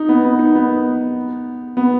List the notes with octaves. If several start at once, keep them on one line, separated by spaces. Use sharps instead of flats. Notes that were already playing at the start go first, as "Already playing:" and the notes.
Already playing: D#4
B3
B3
D#4
B3
B3